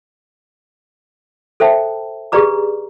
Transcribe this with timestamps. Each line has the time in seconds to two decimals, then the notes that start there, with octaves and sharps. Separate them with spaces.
1.60 A4 C5 E5 G5 A5
2.32 G4 G#4 B4 D5 A#5 D6